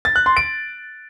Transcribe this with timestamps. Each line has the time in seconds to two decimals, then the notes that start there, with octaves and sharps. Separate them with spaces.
0.05 A6
0.16 F#6
0.26 C6
0.36 D7